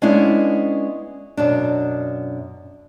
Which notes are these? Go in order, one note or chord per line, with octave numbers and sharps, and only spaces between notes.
G#3 B3 C#4 D4 E4
F#2 B2 D4